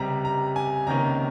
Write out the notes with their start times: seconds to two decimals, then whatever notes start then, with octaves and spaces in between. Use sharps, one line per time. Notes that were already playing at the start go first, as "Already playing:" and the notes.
Already playing: C#2 C3 G3 A#5
0.25 A#5
0.56 G#5
0.86 C#2 C3 D#3 A#3 C#4 A#5